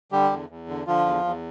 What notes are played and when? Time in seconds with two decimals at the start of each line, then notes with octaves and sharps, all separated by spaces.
0.12 D3 G3 G4
0.30 E2
0.49 E2
0.68 D3
0.87 D3 F3 F4
1.06 E2
1.25 E2